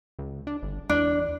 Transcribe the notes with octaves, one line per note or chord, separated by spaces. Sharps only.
C#2
D4
G1
E2 D4